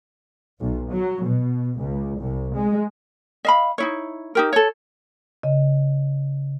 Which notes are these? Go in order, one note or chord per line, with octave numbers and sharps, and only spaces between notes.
B1
F#3
B2
C#2
C2
G#3
D#5 F5 B5
D#4 E4 C#5
D#4 G4 A#4
A4 C#5
C#3 D#5